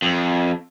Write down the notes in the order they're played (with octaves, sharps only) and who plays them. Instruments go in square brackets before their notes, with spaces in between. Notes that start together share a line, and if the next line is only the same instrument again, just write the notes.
[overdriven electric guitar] F2